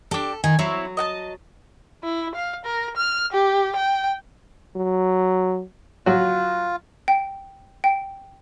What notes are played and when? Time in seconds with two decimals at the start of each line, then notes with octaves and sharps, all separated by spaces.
0.11 D4 G4 A4
0.44 D#3 G#5
0.59 F#3 C4 E4 C#5
0.97 D#5 F#5 A5
2.04 E4
2.35 F5
2.65 A#4
2.96 F6
3.33 G4
3.76 G5
4.76 F#3
6.06 F#3 F4 F#4
7.08 G5
7.84 G5